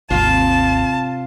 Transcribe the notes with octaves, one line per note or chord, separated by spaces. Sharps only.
G#1 D#2 C3 F4 A5